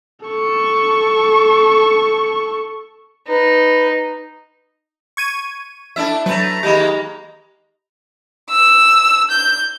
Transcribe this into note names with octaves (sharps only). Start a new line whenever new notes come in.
A4 C#6
D#4 B4
C#6 G#6 D#7
A3 D4 E4 E5 A5
F#3 A3 B4 A#5
D#3 G#3 A#3 G4 D#5 B5
E6
G6